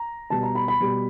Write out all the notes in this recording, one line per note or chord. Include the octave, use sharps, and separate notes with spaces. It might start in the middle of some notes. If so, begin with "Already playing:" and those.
Already playing: A#5
B2 G3 A5
A#5
B5
B5
B2 G3